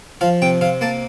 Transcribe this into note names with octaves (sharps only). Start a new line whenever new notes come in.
F3 F5
C3 G5
C3 F5
A#3 A5